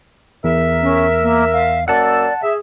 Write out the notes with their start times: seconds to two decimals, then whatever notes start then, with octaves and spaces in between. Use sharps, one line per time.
0.44 E2 A#4 E5
0.82 C#4
1.22 A#3
1.53 F5
1.88 F#2 A#3 D5 F#5 A5 E6
2.42 G#4 E5